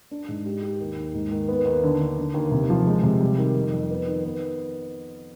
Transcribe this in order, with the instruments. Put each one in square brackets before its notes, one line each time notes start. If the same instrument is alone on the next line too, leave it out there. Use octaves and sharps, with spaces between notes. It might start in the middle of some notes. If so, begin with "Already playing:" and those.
[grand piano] D4
G#2
G4
G4
D#2
D#2
G#2
D#3
B3
D#2
D3
D3
D3
D#2
C3
F3
G#3
C3
G3
D#3
F2
F2
B3
D#3
B3